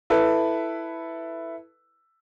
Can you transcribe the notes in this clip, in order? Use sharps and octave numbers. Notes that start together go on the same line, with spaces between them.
E4 A4 B4